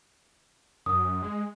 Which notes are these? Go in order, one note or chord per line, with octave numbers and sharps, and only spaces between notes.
F#2 D#6
G#3